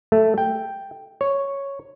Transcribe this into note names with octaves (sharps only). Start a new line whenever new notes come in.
A3
G5
C#5